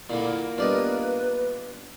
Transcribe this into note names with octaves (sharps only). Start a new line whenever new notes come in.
A#2 D3 A#3 E4
G3 B3 D4 F4 B4 D5 D#5